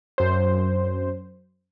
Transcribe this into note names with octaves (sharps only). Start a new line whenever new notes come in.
F#2 C5